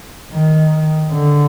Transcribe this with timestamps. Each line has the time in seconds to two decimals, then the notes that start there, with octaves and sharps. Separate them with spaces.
0.33 D#3
1.12 D3